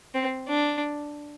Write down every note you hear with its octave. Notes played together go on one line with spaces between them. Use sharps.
C4
D4